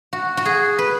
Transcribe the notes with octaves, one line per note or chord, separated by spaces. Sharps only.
F#4
F#4
G#4
B4